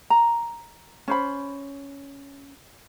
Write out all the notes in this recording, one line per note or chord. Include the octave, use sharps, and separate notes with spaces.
A#5
C#4 C5 B5